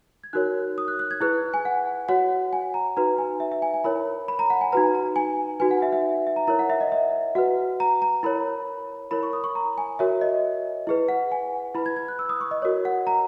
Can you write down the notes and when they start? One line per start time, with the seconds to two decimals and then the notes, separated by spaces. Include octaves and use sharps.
0.24 G#6
0.33 D#4 F#4 A#4 C#5 F#6
0.78 D#6
0.88 F#6
0.99 F#6
1.11 G#6
1.21 E4 G#4 B4 F#6
1.54 G#5
1.65 F#5
2.09 F#4 C#5 F#5
2.53 G#5
2.74 A#5
2.97 D#4 F#4 B4 A#5
3.18 G#5
3.40 E5
3.52 E5
3.62 G#5
3.74 G#5
3.84 E4 A#4 C#5 B5
4.28 B5
4.39 A#5
4.50 F#5
4.61 G#5
4.72 D#4 F#4 B4 A#5
4.95 A#5
5.16 G#5
5.60 D#4 F#4 B4 G#5
5.71 F#5
5.82 E5
5.93 E5
6.27 E5
6.36 A#5
6.47 E4 A#4 C#5 A#5
6.59 F#5
6.70 E5
6.81 D#5
6.92 E5
7.35 F#4 B4 F#5
7.80 A#5
8.02 A#5
8.23 E4 A#4 C#5 B5
9.11 E4 A#4 C#5 B5
9.23 C#6
9.33 D#6
9.44 C#6
9.55 A#5
9.78 G#5
9.99 F#4 A#4 C#5 E5
10.21 D#5
10.87 E4 G#4 B4
11.08 F#5
11.32 G#5
11.75 E4 B4 B5
11.86 G#6
11.96 G#6
12.08 F#6
12.19 E6
12.29 D#6
12.41 C#6
12.51 D#5
12.62 F#4 A#4 C#5
12.85 F#5
13.07 A#5